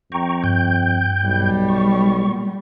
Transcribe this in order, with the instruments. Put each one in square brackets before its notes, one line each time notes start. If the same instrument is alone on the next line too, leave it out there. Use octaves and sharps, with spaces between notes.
[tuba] F2 [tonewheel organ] G5 A#5 C#6
[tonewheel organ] G2 G5 G6
[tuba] B1 [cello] G3
[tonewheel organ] C#6
[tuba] A#2